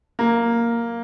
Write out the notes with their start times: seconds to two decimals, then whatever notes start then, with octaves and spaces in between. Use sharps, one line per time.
0.19 A#3